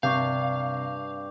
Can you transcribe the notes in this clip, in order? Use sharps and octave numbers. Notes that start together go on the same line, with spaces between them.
G2 C3 F5 C#6 D6 G6